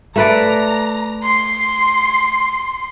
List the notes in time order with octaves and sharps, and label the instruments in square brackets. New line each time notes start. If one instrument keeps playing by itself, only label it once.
[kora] A3 B4 D5 [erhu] A#5
[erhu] C6